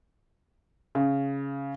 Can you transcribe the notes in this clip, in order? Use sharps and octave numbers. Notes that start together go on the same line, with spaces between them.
C#3